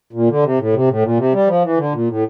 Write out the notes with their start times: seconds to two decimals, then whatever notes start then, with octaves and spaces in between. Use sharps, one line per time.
0.13 A#2
0.28 D3
0.43 C3
0.59 A2
0.73 C3
0.88 A2
1.03 A#2
1.17 C3
1.33 G3
1.47 F3
1.63 E3
1.78 D3
1.93 A#2
2.08 A2